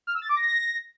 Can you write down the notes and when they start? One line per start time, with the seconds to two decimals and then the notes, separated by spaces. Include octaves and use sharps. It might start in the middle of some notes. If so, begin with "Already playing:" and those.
0.07 F6
0.14 E6
0.22 A6
0.29 D6
0.36 A#6